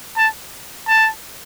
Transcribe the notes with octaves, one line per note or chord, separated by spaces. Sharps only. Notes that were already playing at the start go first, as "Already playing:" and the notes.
A5
A5